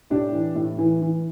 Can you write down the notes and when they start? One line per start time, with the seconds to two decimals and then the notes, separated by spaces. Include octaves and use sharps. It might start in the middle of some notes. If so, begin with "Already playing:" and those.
0.10 A2 D4 G4
0.33 E3
0.55 A2
0.78 E3
1.02 E3